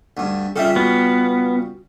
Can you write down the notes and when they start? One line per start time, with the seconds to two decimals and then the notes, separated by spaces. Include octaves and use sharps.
0.17 D2 G2
0.56 C#3 G3 F4 A4 E5
0.76 B3 F#4